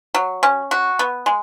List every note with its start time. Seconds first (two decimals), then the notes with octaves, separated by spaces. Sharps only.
0.14 F#3
0.43 C#4
0.71 F#4
0.99 B3
1.26 G#3